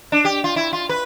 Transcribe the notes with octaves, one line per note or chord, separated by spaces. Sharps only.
D4
G4
F4
E4
F4
B4